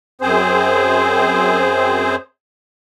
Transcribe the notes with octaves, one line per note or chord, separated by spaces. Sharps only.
F#2 C4 G#4 C5